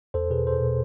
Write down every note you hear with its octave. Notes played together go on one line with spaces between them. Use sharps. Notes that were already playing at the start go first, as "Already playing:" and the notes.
E2 A4 C5
B2 G#4 B4
E2 A4 C5
B2